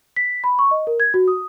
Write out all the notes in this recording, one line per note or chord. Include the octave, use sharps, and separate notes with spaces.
B6
B5
C#6
D#5
A#4
G#6
F#4
D#6